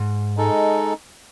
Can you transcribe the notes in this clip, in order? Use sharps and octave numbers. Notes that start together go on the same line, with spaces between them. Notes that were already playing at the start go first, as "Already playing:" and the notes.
Already playing: G#2
G#3 D#4 A4